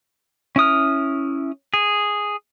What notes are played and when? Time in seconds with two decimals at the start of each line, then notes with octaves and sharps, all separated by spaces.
0.56 C#4 E4 D#6 F6
1.74 G#4